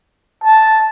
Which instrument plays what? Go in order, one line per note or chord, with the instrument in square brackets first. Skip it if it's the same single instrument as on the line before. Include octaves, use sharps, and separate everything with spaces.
[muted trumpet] A5